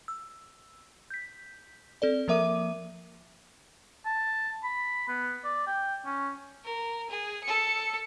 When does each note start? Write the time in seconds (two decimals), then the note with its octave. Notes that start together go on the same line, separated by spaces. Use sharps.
0.08 E6
1.10 G6 B6
2.02 C4 A4 D5
2.28 F3 A#3 A#4 E5 D6 D#7
4.06 A5
4.64 B5
5.08 B3
5.45 D5
5.67 G5
6.06 C#4
6.64 A#4
7.10 G#4
7.43 A4 C#7